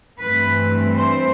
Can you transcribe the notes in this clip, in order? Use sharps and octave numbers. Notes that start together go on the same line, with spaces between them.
G2 E3 A3 C4 B4
C5